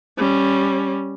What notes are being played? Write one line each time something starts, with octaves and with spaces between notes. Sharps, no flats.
G3 C#4